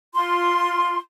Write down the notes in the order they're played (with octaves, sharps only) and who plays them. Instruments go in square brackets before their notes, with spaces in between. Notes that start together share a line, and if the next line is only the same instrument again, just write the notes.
[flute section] F4 C6